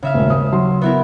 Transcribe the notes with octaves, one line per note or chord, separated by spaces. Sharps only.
C#3 E5 F5
D#1 G#1
D#6
F#3 C6
B3 E4 A#4